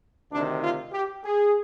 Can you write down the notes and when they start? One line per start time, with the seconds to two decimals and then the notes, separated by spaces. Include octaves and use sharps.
0.31 D2 C3 D#3 D4
0.62 F4
0.93 G4
1.24 G#4